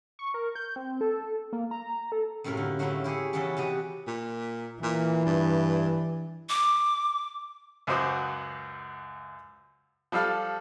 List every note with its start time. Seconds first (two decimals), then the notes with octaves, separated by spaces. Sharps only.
0.19 C#6
0.34 A#4
0.55 G6
0.76 C4
1.01 A4
1.53 A#3
1.71 A#5
2.12 A4
2.44 F#2 A2 C3 F4 A#4 B4
2.57 D3
2.79 D3 F#3 A3 C4 E4 F4
3.04 E4 G4 G#4 C#5
3.33 C#3 E3 F#3 B3 C#4 A4
3.57 C3 E3 F#4 G4 D#5
4.07 A#2
4.82 A#2 E3
5.25 G2
6.50 D6
7.87 C#2 F#2 F#4 C5 D6 D#6
10.12 F3 G3 A4 F5 F6